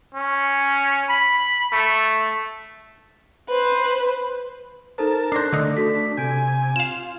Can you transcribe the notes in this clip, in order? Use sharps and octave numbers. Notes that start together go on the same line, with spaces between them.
C#4
B5
A3
B4 C5
D#4 A4 A#4 C5 A5
D4 C5 F#6 A#6 C7
D3 A3 D4 D#4
F#4 A4 B6
C3 G#5 G6 D7
F4 F5 E7